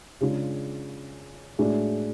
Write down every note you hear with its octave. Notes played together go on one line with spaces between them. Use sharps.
C#3 G#3 D4 F4 G#4
A2 G#3 D4 F#4